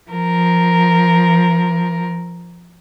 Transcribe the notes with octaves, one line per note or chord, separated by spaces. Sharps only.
F3 A#4